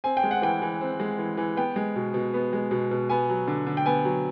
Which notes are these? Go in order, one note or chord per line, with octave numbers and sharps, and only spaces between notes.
C4 G#5
G5
G#3
F#5
E3 G5
E3
C4
G#3
E3
E3
B3 G5
G#3
B2
B2
B3
G#3
B2
B2
B3 G#5
F#3
D3
D3
G5
B3 G#5
F#3